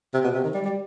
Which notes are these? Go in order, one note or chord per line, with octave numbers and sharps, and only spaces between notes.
C3
B2
C3
D#3
G3
G3